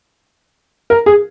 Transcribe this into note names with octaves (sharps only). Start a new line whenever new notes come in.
A#4
G#4